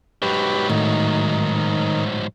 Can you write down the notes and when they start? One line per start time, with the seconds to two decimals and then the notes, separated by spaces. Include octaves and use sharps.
0.22 G#2 F#3 G4 B4
0.69 A2 D#3